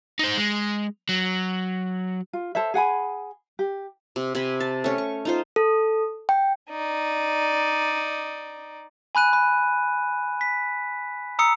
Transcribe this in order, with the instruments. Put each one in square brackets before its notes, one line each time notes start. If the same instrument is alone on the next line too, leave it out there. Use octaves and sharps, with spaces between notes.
[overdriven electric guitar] D#4 C5
G#3
F#3
[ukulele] F4
A4 C5 C#5 E5
G#4 F#5 G#5 B5
G4
[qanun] C3
C3 G#5 B5
A5
A3 C#4
C#6
D#4 F4 C5
[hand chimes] A4
G5
[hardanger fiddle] D#4 D5
[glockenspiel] G#5 B5 F#6 D#7
B5
B6
A#5 D#6 E6 C#7